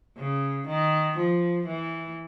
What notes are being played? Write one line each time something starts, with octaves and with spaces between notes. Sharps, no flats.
C#3
D#3
F3
E3